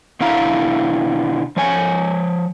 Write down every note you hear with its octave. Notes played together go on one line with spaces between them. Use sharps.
B2 D3 E4 F5 A#5
F3 C#5 G#5